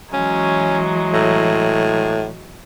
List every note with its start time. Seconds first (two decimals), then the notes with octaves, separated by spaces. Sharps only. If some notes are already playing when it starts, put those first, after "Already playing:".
0.14 E3 F#3 G#3 C#4
1.14 A2